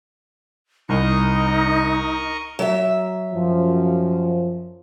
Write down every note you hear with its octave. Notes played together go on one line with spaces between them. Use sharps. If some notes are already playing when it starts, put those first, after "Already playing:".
C2 D#4 A#4 D#5 C#6
F#3 E5
F#2 F3